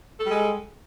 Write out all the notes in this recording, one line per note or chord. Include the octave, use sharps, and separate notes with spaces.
G3 G#3 A4